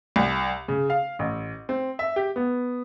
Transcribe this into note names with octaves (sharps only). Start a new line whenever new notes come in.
C2
C#3
F5
A1
C4
E5
G4
B3